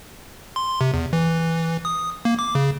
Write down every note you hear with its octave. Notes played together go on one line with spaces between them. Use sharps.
C6
C3
E2
E3
D#6
A#3
D6
C#3